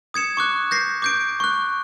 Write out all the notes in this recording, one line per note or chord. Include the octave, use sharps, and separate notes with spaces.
D#6 G#6 C#7 E7
C#6 D6 F#6
G6 A#6 C7
D6 G6 D7
C#6 F#6